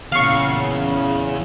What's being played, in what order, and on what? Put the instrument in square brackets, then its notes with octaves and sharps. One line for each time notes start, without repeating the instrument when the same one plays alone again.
[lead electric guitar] E2 [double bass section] A#2 [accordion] C#3 [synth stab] F5 C#6